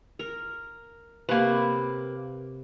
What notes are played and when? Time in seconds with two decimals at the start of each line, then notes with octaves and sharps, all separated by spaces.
0.19 A#4
1.29 C3 A#3 B4